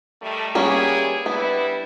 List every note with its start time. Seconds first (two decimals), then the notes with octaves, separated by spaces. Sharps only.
0.22 D#3 G3 A3
0.55 G3 A#3 B3 C#4 E4 G#4
1.26 G3 B3 D4 E4